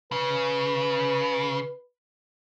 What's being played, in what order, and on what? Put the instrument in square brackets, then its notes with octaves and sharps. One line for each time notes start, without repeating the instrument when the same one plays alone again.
[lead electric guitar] C#3 [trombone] B4